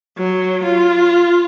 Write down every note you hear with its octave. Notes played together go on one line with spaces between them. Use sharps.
F#3
F4